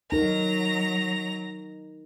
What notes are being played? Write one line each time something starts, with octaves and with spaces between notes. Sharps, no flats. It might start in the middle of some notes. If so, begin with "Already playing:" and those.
F#3 D#4 A#4 A#5